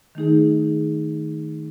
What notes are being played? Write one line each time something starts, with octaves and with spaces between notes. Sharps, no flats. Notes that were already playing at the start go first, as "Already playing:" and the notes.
D#3 A3 D#4 G#4